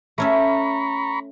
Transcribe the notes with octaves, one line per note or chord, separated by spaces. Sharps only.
A3 C#4 E5 A#5 B5 C#6